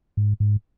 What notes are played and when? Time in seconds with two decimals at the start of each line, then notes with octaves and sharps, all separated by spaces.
0.17 G#2
0.40 G#2